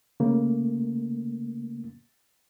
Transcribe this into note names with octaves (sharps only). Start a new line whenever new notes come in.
C#3 A3 A#3